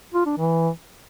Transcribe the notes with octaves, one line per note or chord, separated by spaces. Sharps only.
F4
D4
E3